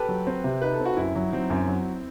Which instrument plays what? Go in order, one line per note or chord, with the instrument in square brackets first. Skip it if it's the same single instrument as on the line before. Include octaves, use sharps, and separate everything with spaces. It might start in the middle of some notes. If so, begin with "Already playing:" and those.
Already playing: [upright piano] G4 A4 B4
[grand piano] F#3
C4
C3
[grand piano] D#4 [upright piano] B4
[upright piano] A4
[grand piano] C4
[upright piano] F#4
[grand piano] F#2 [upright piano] E4
[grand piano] F#3
[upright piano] D#4
[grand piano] F#3 [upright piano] C4
[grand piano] F#2
F#3